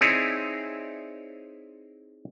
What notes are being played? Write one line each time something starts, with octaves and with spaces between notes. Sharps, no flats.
C4 D#4 E4 G#4 C#5 D5